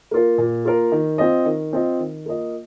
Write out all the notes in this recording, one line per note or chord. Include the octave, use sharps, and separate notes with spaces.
A#3 F4 A#4
A#2
A#3 F4 A#4
D#3
C4 F4 D#5
D#3
C4 F4 D#5
D#3
A#3 F4 D#5